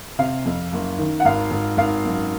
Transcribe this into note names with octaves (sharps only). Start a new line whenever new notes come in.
C3 F5
F2
F#1
D#3
F#5
G#1 F5
G#1
G#1 F5
F#2